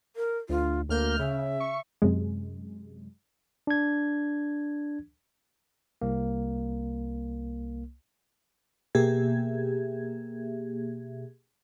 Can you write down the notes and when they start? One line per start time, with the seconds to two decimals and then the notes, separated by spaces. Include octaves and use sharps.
0.16 A#4
0.49 D2 F4
0.89 D2 A#3 F6 G6
1.19 C#3 E5
1.60 C#6
2.02 F#2 C3 G#3
3.67 D4 G#6
6.02 C2 A#3
8.95 B2 A#3 G4 G#4 E5 G#6